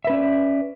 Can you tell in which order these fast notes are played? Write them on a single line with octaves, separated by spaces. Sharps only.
E5 B4 C#4 D5